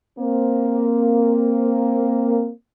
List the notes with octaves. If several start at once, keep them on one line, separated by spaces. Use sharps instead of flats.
A#3 C4